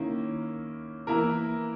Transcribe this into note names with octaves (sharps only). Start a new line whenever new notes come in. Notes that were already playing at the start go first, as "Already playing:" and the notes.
Already playing: D#3 A#3 C#4 E4
E3 A#3 E4 A#4